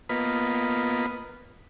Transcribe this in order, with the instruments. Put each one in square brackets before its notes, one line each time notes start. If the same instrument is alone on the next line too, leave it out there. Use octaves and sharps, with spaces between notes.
[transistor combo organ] A#3 B3 F4 B4 D#5